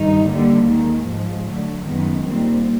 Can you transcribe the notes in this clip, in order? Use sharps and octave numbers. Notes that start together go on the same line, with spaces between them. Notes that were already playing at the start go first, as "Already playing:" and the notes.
Already playing: G2 D#3 D#4
D3 G3 A#3
D#2 D#3 G#3
G#2 F3 G#3
D3 F#3 A3
F#2 D#3 G#3 B3
A#2 G3 C4